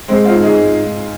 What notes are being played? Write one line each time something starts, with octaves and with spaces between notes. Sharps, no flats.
G#3 C4
C4 F4
G#2
D#4 G#4
G#2
G#2